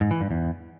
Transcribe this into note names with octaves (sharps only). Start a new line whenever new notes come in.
G#2
E3
G2
E2